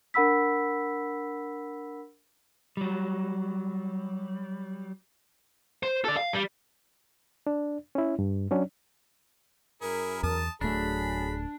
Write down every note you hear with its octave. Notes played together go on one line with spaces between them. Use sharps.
D4 A#4 F#5 B5 E6 B6
F#3 G3
C5
A4 D5
F5
G3
D4
C#4 E4
G2
F#3 C#4 D4
F#2 E4 G#4 A#4
E2 A5 D#6
D1 F#3 A3 D4 G#4 B5